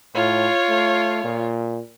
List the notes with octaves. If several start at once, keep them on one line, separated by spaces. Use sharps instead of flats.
A2 F4 C#5
A3
A#2